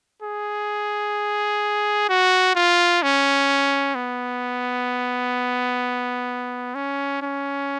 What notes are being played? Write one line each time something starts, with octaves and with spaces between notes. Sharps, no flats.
G#4
F#4
F4
C#4
B3
C#4
C#4